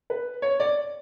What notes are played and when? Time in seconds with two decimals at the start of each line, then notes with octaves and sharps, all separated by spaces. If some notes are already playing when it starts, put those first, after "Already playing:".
0.10 B4
0.42 C#5
0.60 D5